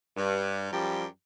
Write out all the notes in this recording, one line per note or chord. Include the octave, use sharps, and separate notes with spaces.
G2
F#2 F3 G3 G4